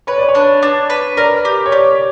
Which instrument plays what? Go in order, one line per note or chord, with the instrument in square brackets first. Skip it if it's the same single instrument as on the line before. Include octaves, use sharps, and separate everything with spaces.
[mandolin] B4 [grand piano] C#5
[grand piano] D5
C#5
[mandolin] D4
D4
B4
[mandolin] A#4 [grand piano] D5
[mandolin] G4
[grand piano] C#5
[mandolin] G4 [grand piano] D5